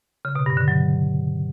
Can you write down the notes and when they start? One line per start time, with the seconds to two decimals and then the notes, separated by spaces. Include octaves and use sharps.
0.25 C#3
0.35 B2
0.46 G2
0.57 D3
0.68 F#3